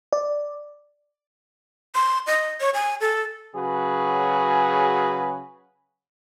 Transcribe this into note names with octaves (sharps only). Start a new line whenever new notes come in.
D5
C6
D#5
C#5
G#5
A4
C#3 F#3 F#4 G#4 B4